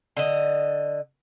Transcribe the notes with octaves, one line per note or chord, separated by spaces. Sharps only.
D3 D#5